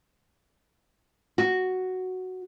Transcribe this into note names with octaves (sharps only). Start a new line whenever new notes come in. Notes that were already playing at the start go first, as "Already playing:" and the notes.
F#4